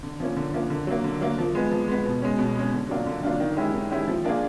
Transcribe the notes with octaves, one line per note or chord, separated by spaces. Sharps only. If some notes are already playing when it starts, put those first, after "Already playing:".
D3
F3 A#3 C#4
D3
F3 A#3 C#4
D3
F#3 A#3
D3
F#3 A#3
F3
G#3 B3
F3
G#3 B3
B2
G#3 C#4
B2
G#3 C#4
D3
F#3 A#3 D4 F4
D3
F#3 A#3 D4 F4
D#3
G#3 C#4 E4 G4
D#3
G#3 C#4 E4 G4
F3
A#3 D4 F4 G#4